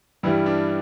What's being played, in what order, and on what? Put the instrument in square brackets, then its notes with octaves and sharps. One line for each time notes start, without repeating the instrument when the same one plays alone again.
[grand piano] G2 E3 G3 E4
D4